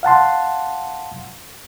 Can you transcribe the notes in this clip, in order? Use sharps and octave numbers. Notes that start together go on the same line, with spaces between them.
F5 F#5 A5 C6